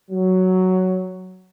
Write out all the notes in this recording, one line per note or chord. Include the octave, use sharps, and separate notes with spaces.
F#3